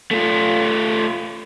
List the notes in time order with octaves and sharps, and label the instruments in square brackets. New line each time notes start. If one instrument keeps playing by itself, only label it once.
[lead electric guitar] A3 F4